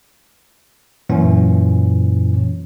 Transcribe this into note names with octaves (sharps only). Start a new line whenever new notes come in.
F#2 A#2 E3 C#4